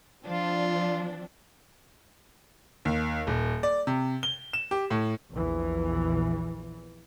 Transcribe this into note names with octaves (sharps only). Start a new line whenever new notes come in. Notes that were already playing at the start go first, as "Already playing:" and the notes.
F3 C4 D4 F4
D#2
D#1
D5
C3
G7
E7
G4
A2
A#1 E2 E3